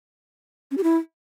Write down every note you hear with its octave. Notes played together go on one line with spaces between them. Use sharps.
C#4
G4
E4